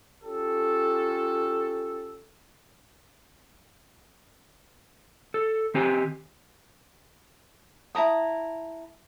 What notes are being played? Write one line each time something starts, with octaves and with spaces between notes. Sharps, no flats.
C#4 F4 G4 A4
A4
D#3 C4 G4 G#5
E4 A5 A#5 D#6